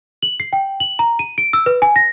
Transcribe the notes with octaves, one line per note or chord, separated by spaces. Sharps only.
F#7
C7
G5
F#7
A#5
D#7
D7
E6
B4
G#5
A#6